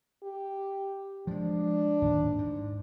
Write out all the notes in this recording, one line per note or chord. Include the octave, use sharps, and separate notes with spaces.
G4
F3 G#3 D4
D1 G#1 D#2
G#2